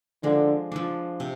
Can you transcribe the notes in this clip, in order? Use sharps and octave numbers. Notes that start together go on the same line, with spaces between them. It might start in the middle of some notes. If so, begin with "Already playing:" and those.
D3 F3 G#3 D4
F3 G#3 D4
C3